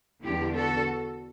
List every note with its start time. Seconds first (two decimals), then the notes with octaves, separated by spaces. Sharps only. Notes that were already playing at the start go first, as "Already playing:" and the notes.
0.23 E2 D3 E4 G4
0.54 F#4 A4